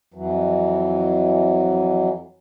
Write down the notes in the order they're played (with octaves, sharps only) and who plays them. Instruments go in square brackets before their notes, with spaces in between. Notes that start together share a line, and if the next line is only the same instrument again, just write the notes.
[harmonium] F2 E3 F#3